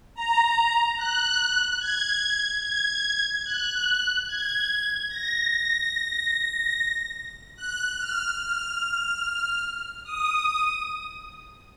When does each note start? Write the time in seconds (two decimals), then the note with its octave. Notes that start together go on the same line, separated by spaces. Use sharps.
0.14 A#5
0.96 F#6
1.79 G#6
2.62 G#6
3.44 F#6
4.26 G#6
5.08 A#6
7.56 F#6
7.98 F6
8.38 F6
10.03 D#6